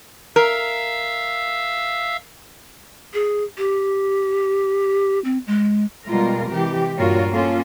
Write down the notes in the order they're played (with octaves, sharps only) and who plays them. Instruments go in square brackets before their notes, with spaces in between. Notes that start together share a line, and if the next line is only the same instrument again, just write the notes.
[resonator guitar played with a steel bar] A#4 [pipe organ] E5 F5 E6
[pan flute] G#4
G4
C4
G#3
[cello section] B2 G3 G#3 F4 A#4
C3 E3 G#3 G4
G2 A#2 F4 F#4 A#4 C#5
A#3 C#4 F4 A4